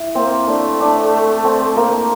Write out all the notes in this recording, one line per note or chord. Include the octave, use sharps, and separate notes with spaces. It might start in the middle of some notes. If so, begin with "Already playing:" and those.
Already playing: E4
A#3 C4
A3 D4
D4
C4
A#3